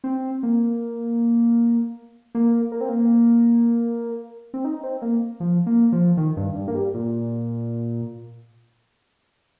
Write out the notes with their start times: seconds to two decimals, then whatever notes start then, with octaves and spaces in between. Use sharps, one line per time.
0.04 C4
0.43 A#3
2.35 A#3
2.72 A#3
2.81 C4
2.89 A#3
4.54 C4
4.65 D#4
4.83 C4
5.02 A#3
5.40 F3
5.66 A#3
5.92 F3
6.17 D#3
6.37 G2
6.55 G2
6.68 A#3
6.75 G3
6.94 A#2